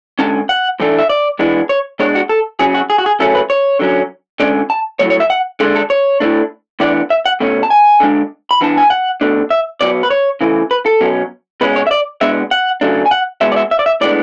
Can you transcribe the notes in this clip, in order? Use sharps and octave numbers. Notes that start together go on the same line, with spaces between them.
D3 G#3 C#4 A5
F#5
A2 E3 A3 D4
E5
D5
E3 G#3 B3 D4
C#5
B2 G#3 D4 C#5
F#4
A4
C#3 F#3 C#4 G#4
F#4
G#4
F#4
G#4
C#3 F#3 A3 C#4 A4
B4
C#5
D3 F#3 C#4
D3 G#3 C#4 D5
A5
A2 F#3 A3 C#5
C#5
E5
F#5
D3 G#3 D4 G#4
A4
C#5
A2 F#3 A3 D4
A2 E3 B3 D4 D5
E5
F#5
B2 A3 C#4
A5
G#5
D3 G#3 D4
B5
E3 B3 D4 A5
G#5
F#5
B2 A3 D4
E5
B2 F#3 B3 D5
B4
C#5
C#3 E3 A3
B4
A4
B2 F#3 C#4
B2 G#3 C#4 B4
C#5
E5
D5
B2 G#3 B3 D4 E5
F#5
C#3 F#3 A3 D4
G#5
F#5
B2 G#3 B3 E5
D5
E5
E5
D5
E5
A2 G#3 B3 D4 D5